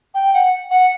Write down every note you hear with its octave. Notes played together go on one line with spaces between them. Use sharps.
G5
F#5
F#5